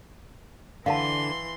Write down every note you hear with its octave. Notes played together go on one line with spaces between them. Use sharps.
D3 E3 B4 F5 F#5 A5 C6